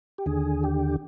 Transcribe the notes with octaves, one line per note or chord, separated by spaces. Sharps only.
G4
D#2 D3 G#4
G4